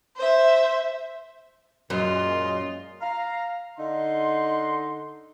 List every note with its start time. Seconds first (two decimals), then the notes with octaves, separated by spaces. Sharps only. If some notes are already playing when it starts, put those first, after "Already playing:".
0.17 C5 E5
1.90 F#2 A#2 G#3 F4 D#5
3.02 F5 A#5
3.78 D3 D#4 C6